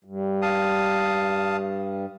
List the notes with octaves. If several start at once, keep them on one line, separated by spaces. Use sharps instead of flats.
G2
F5 A5 D#6